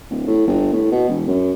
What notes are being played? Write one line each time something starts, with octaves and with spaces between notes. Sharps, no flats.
D1
A2
G1
A2
B2
E1
F#2